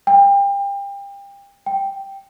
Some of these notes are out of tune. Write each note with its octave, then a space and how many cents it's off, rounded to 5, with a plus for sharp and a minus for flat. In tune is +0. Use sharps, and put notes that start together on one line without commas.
G5 +30
G5 +0